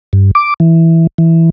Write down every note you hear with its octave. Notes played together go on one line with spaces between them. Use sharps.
G2
D6
E3
E3